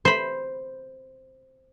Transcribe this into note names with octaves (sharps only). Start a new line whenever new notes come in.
C5 B5